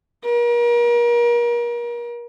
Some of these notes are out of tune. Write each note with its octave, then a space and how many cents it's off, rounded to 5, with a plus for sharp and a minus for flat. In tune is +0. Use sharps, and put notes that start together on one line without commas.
A#4 +35